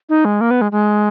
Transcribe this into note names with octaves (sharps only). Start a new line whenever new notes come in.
D#4
G#3
A#3
B3
G#3
G#3